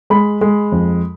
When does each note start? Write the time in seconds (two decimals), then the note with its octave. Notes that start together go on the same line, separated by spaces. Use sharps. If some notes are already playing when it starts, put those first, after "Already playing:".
0.10 G#3 B5
0.41 G#3
0.72 F2